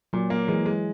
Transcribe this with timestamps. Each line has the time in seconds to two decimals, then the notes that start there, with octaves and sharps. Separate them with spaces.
0.13 A#2 F#3
0.30 A#3
0.48 E3 G#3
0.66 G#3